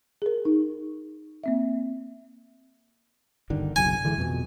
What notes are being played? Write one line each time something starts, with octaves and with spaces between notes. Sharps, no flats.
G#4 A#4
D#4
A#3 C4 E5
G1 D3 D#3
F#1 B1 G#5
D3 E3 G#3
F2 B2